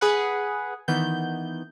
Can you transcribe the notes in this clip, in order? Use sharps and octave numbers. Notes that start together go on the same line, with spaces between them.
G#4 B4 F#5
D#3 E3 B3 G6